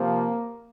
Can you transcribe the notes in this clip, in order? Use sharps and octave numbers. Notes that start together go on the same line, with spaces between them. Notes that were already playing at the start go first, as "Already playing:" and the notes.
Already playing: C3 F3 A#3